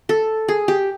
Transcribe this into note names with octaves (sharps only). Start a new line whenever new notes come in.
A4
G#4
G4